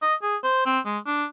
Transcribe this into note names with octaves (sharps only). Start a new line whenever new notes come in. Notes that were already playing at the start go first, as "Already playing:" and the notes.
D#5
G#4
C5
C4
G#3
D4